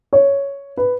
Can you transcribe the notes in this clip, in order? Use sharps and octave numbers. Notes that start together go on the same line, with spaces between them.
C#5
B4